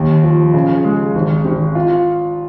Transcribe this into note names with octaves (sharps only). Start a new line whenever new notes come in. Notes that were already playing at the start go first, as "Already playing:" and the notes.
Already playing: D#2
F3
C#3
G#3
G#1
G#1
F4